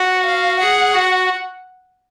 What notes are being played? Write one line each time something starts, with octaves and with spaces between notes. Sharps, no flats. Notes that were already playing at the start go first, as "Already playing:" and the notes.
Already playing: F#4 F#5
F5
G#4 F#5
F#4